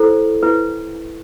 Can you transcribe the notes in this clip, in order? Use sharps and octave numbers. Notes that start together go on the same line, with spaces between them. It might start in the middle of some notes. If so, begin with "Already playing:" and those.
Already playing: E4 A4 C5
E4 B4